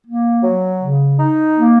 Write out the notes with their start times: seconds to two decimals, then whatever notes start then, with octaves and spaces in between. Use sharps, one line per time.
0.05 A#3
0.43 F#3
0.82 C#3
1.20 D#4
1.57 A#3